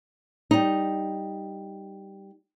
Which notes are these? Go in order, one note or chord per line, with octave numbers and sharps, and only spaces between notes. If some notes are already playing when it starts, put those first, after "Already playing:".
G3 D#4